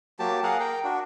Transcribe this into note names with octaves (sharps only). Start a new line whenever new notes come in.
F#3 A#3 G4 A5
G#4 A#4 F5 F#5
A#4 G5
D4 F#4